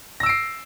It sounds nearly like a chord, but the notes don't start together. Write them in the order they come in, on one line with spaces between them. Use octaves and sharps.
A#6 E6 D7 C7